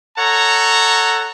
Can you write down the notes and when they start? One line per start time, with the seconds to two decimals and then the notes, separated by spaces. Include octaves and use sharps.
0.18 A4 C#5 F#5 A#5